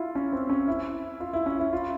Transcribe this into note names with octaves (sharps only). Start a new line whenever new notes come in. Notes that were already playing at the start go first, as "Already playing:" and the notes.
Already playing: E4 F4
C#4
C4
C#4
E4
F4
E4
C#4
E4
F4